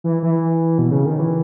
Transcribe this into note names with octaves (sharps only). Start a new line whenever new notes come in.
E3
E3
B2
C#3
D#3
E3